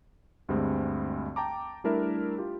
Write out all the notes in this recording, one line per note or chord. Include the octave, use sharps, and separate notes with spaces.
D2 G2 G3 G#3 C4
G5 A5 A#5 D6
G3 A3 D4 E4 A#4 E5
F4 G4